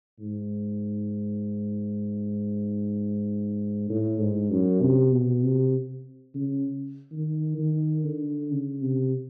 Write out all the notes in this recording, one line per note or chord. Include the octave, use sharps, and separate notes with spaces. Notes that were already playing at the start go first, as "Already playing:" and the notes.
G#2
A2
G#2
F#2
C3
B2
C3
C#3
D#3
D#3
D3
C#3
C3